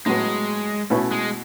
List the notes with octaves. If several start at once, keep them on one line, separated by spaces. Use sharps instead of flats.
A2 F#3 G#3 B3
B2 A3 C#4 E4 B4
G#3